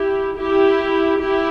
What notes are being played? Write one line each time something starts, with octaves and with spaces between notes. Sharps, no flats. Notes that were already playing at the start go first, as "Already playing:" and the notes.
Already playing: E4 G4
E4 G4
E4 G4